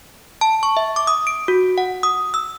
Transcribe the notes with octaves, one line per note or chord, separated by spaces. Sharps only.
A5
C#6
E5
D6
D#6
D7
F#4
F#5
D#6
E6